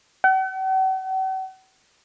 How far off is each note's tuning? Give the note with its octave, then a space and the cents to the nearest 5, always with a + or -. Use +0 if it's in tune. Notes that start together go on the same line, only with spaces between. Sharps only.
F#5 +45